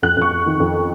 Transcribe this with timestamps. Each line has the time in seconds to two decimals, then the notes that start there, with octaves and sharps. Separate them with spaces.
0.02 F2 F#6
0.17 F2 C#6
0.31 F2
0.46 D#3
0.60 F2